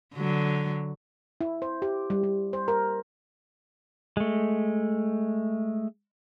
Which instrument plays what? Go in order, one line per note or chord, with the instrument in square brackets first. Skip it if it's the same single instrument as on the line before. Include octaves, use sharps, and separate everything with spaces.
[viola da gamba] D3 F#3
[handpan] E4
C5
G4
G3
G3
C5
A#4
[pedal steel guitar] G#3 A3